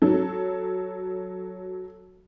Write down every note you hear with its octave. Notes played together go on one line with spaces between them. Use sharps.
F#3 A4